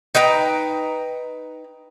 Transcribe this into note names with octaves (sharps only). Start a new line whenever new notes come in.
D#4 B4 G5 A#5